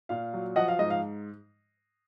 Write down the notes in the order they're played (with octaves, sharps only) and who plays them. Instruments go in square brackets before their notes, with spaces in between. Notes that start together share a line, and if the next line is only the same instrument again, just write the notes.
[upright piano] A#2 F5
F#3
F3 D#5 F#5
F5
G#2 D#5
F5